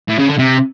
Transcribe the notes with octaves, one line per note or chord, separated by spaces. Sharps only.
A2
C#3
D3
C3